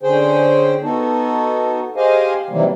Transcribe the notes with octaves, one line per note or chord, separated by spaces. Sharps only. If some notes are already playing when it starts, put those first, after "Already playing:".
D3 C#4 G#4 C5 G5
B3 D#4 F#4 A4
G4 G#4 C5 D#5 F5 G#5
C3 D#3 E3 F#3 G3 A#3